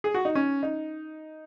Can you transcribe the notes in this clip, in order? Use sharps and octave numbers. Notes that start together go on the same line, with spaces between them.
G#4
F#4
D#4
C#4
D#4